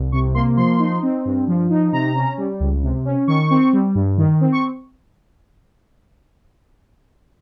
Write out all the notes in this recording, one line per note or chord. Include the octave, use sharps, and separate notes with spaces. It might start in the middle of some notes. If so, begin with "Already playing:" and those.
Already playing: C2
C3 C#6
A#3 C6
F3 C6
D#4
C4
G2
F3
D#4
C3 A#5
C#4
G3
C#2
C3
C#4
D#3 C#6
C4
G3
G2
D#3
C4
C#6